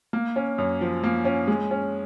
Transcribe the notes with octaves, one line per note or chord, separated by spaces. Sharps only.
A#3
C#4
F#2
F3
A#3
C#4
G#3
C#4